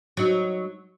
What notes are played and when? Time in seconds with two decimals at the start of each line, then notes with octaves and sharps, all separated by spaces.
0.17 F#3 D#4